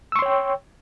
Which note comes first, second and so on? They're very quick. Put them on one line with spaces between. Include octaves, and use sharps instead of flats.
E6 C#6 C6 C#5 G5